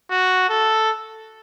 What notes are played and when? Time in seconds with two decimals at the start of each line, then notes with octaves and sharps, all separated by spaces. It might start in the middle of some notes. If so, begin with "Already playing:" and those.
0.10 F#4
0.49 A4